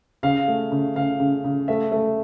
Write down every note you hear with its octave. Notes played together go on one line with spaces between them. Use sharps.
C#3 F5
A3
C#3
C#3 F5
C#3
C#3
A3 E5
A3